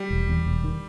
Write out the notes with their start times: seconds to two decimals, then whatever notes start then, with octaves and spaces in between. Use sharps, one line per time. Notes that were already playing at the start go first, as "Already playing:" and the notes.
Already playing: G3
0.11 E1
0.29 E2
0.46 E1
0.64 D#3